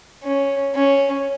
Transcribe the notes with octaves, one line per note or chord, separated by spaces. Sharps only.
C#4
C#4